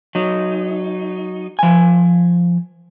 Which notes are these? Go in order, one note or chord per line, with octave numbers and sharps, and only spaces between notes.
F#3 D#4
F3 G#5